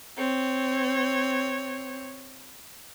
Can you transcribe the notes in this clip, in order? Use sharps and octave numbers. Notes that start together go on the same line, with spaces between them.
C4 C#5